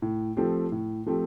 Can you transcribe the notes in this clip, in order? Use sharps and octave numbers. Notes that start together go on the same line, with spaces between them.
A2
F3 A3 C4 G4
A2
F3 A3 C4 G4